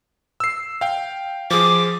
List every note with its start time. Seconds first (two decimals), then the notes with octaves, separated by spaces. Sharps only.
0.40 E6 C7
0.81 F5 G5
1.50 F3 F4 G#4 D6